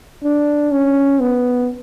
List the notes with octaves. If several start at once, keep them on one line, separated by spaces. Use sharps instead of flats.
D4
C#4
B3